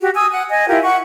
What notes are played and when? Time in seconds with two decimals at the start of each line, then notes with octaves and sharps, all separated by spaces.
0.01 F#4 G4
0.15 G#5 D#6 E6
0.32 F#5 F#6
0.50 D#5 G#5
0.67 E4 F4 G4 A#4
0.83 F#5 C#6